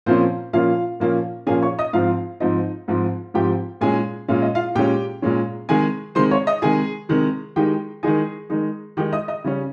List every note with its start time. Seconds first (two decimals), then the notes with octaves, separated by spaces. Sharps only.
0.06 A#2 F3 A#3 C4 C#4 C5
0.53 A#2 F3 A#3 C#4 F4 F5
1.00 A#2 F3 A#3 C#4
1.47 A#2 F3 A#3 C#4 G#4 G#5
1.62 C#5 C#6
1.79 D#5 D#6
1.93 G#2 F3 C4 F4 F5
2.40 G#2 F3 C4 D#4 D#5
2.88 G#2 F3 C4
3.34 G#2 F3 C4 G4 G5
3.81 A#2 G#3 C#4 G#4 G#5
4.28 A#2 G#3 C#4 F5
4.42 D#5
4.55 F4 F5
4.75 A#2 G#3 C#4 G4 G5
5.22 A#2 G#3 C#4
5.69 C3 D#3 G#3 G#4 G#5
6.15 C3 D#3 G#3 C5 C6
6.31 C#5 C#6
6.47 D#5 D#6
6.62 C3 D#3 G#3 G#4 G#5
7.09 C3 D#3 G#3
7.56 D#3 G#3 D#4 G4 G5
8.03 D#3 G#3 D#4 G#4 G#5
8.50 D#3 G#3 D#4
8.97 D#3 G#3 D#4 G4 G5
9.13 D#5 D#6
9.28 D#5 D#6
9.44 C#3 G3 C#4